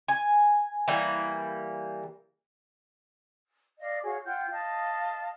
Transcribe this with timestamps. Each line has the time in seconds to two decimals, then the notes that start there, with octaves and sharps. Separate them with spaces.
0.08 G#5
0.88 E3 G3 A#3
3.80 D5 D#5 F5
4.03 F#4 G#4 C#5 F5
4.24 F4 F#5 G5 G6
4.51 D#5 F5 A5